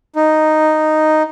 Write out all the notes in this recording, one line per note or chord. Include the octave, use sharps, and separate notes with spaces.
D#4